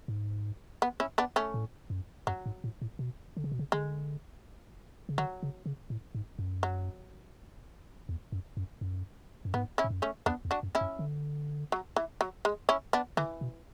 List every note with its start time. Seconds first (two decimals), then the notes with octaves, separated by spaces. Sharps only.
0.08 G#2
0.82 B3
1.00 C#4 E4
1.18 B3 D4
1.36 A3 C#4
1.54 A2
1.90 F#2
2.27 F#2 F#3
2.46 G#2
2.64 A2
2.82 A2
2.99 B2
3.37 D3
3.44 C#3
3.52 B2
3.59 C#3
3.72 D3 G#3
5.09 C#3
5.18 D3 F#3
5.43 C#3
5.66 C#3
5.90 A2
6.15 G#2
6.39 F#2
6.63 F#3
8.09 E2
8.32 F#2
8.57 F#2
8.81 F#2
9.45 F#2
9.54 G#2 B3
9.78 C#4 E4
9.84 G#2
9.90 F#2
10.02 A3 C#4
10.26 E2 B3 D4
10.45 E2
10.51 D4 F#4
10.63 F#2
10.75 C#4 E4
10.81 F#2
10.99 D3
11.72 F#3
11.96 E3
12.21 F#3
12.45 G#3
12.69 C#4 E4
12.93 B3 D4
13.17 D3 E3
13.41 B2